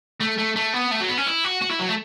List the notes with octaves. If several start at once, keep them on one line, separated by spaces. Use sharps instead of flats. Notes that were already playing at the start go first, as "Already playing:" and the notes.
A3
A3
A3
B3
A3
F#3
B3
C#4
E4
F#4
F#4
E4
F#3
A3